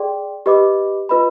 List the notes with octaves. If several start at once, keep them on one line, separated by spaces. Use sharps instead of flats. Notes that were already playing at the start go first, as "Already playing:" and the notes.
Already playing: G#4 D5 G5 C6
G4 B4 D#5 B5 D6
F4 B4 D#5 B5